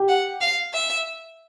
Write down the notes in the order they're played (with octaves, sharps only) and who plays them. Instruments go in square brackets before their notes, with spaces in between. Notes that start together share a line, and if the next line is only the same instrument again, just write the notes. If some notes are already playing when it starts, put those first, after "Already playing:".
Already playing: [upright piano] G4
[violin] F#5
F5
E5